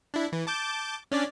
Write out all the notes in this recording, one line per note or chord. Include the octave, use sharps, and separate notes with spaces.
D4 E4
E3
A5 D6 G6
C#4 D4 D5